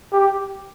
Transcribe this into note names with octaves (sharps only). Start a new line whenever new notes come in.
G4